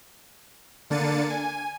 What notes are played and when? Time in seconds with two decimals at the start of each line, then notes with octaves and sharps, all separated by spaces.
0.90 D3 A#3 D4 A6 C#7 D#7
1.30 G#5